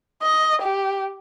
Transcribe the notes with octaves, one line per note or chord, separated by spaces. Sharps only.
D#5
G4